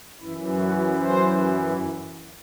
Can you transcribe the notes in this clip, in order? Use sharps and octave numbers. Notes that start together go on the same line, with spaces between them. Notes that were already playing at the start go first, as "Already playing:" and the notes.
F#2 E3 E4
F#4
C5